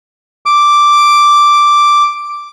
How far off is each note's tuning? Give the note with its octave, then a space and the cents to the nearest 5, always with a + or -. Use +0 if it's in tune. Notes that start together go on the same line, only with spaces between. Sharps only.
D6 +0